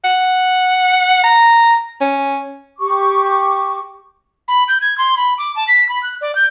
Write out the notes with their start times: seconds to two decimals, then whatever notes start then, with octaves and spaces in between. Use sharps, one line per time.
0.04 F#5
1.24 A#5
2.01 C#4
2.79 G4 C#6 D6
4.48 B5
4.68 G6
4.81 G#6
4.98 C6
5.17 B5
5.38 D6
5.56 A5
5.67 B6
5.89 B5
6.02 F#6
6.21 D5
6.35 G6